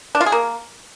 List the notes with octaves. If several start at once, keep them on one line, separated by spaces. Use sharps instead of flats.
D4
F4
G#4
A#3